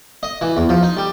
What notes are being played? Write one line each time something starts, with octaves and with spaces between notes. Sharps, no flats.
D#5
E3
E2
F3
D#4
G3